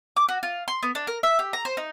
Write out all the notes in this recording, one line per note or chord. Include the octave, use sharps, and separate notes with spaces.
D6
F#4
F4
C6
B3
D4
A#4
E5
G4
A#5
C5
D#4